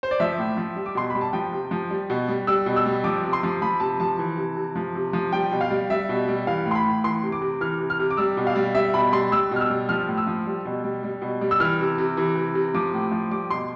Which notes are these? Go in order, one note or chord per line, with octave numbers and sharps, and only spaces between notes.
C5
D5
F3 E5
A2
F3
G3
D6
B2 C6
G3 B5
A5
F3 G5
C3
F3
G3
B2
G3
G3 E6
B2
E6
G3
F3 D6
C3
C6
F3
F3 B5
C3 A5
F3 A5
E3
C3
C3
F3
C3
F3
G3 G5
B2
F5
G3
G3 E5
B2
G3
E3 F5
A2
C6
B5
A2
E3 C6
C3
D6
C3
E3 F6
C3
F6
C3
D6
G3 E6
B2
F5
G3
G3 E5
B2 B5
G3 C6
G3 E6
B2 F6
E6
G3
F3 F6
A2
E6
F3
G3
B2
G3
G3
B2
G3
E6
E3 F6
C3
C3
E3
C3
C3
F3 D6
A2
F3
G3 D6
B2 C6